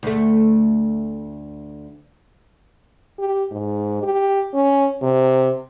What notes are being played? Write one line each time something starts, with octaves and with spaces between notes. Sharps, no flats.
D2 A3
G4
G#2
G4
C#4
C3